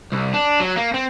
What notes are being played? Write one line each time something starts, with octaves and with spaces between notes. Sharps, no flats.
C2
D4
F#3
A#3
C4